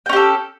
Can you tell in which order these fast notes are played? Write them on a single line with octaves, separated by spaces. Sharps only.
G5 C#4 G4 A4